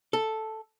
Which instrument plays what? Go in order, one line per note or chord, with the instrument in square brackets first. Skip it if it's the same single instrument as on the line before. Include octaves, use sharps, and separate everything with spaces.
[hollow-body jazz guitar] A4